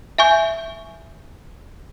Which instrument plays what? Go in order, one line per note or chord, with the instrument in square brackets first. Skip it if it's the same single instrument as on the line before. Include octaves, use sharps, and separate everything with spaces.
[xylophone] E5 G#5 C#6 G6